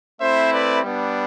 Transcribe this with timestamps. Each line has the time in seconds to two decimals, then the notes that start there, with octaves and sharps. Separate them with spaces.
0.21 A3 C4 E4 C5 E5
0.52 B4 D5
0.83 G3 B3 D4